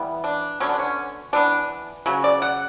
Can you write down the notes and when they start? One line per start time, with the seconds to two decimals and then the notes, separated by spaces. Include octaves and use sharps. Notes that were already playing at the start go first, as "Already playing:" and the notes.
Already playing: E3 G3 B3
0.24 D4
0.60 D3 F#3 B3 C#4
0.69 D4
0.79 C#4
1.33 E3 B3 D4
2.06 C#3 F#3
2.24 D5
2.42 F#5